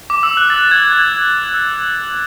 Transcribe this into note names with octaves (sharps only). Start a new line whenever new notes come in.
D6
E6
F#6
A6
G#6
G#6
E6